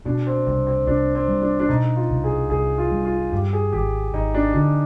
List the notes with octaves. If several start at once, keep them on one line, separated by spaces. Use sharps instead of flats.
B2 D4
C4
C2 C4
C4
C2 D4
C4
G3
D4
D4
B2 D#4
F4
C2
G#4
C2 G#4
F4
G3
F4
G2 G4
G#4
G#1 G4
G#1 D#4
D4
D3 D4